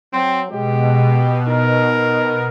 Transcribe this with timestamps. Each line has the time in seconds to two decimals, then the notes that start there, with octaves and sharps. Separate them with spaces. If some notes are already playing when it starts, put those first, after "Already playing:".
0.13 F#3 C4
0.51 B2 G#3 G4
1.48 D#4 A#4